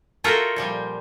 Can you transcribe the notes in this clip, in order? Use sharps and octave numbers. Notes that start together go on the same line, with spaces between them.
F4 F#4 A4 A#4 E5 G5
A#2 F3 G3